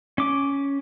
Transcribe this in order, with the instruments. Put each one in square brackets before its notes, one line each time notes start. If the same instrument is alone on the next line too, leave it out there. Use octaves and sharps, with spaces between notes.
[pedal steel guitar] C#4 D6